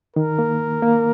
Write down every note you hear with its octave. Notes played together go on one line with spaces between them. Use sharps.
D#3 A#4
A#3
A#3